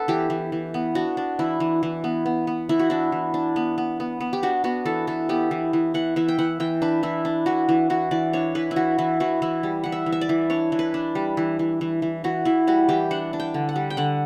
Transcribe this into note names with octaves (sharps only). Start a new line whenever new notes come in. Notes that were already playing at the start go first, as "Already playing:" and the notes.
Already playing: B3 D4 A4 B4
E3 G4
E3
E3
B3
D4 F#4
D4
E3 E4
E3
E3
B3
B3
B3
E3 E4
F#4
D4 E4
E3
D4
B3
B3
B3
B3
G4
D4 F#4
B3 F#4
E3 A4
E3 A4
B3 G4
E3
E3
E3 F#5
E3 E5
G5
E3 F#5
E3 G5
D4 B4
E3 E4
D4
E3 F#4
E3
E3 F#4
E3 D5
D4 C#5
E3 B4
E4
E3 F#4
E3 E4
E3 F#4
E3 E4
G3
E3 F#5
E5
E3
E5
D5
E3
D4 C#5
E3
B4
D4
G3
E3
E3
E3
E3
E3 F#4
E3 E4
G3 F#4
E3 G4
D4 F#5
D4
G5
D3
F#5
G3
G5
D3 F#5